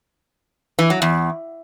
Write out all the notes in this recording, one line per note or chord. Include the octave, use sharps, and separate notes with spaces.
E3
F#3
E2